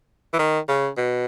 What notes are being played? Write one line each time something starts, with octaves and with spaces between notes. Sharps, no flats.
E3
D#3
C#3
B2